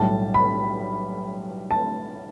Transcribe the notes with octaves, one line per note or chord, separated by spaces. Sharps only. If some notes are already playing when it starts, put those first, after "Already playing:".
Already playing: B1 A2 G3 A5
B5
A5